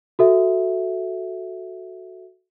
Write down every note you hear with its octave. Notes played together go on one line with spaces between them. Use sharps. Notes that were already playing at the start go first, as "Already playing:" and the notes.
F#4 A4 E5